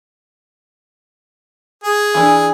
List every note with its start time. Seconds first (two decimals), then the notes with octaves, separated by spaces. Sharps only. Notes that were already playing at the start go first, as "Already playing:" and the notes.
1.84 G#4
2.14 E3 D4